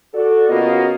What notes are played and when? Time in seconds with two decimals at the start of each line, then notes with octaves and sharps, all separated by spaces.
0.14 F#4 A4 D5
0.50 C#3 A#3 B3 F4 F#4 D#5